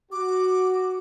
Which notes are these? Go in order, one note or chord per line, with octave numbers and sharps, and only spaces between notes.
F#4 D6